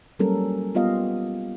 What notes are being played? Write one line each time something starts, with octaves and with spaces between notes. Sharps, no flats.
F#3 G3 A#3 C#4 A4 A#4
G3 B3 F4 G4 D#5 F5